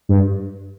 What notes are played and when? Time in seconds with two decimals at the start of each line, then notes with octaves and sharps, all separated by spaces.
0.09 G2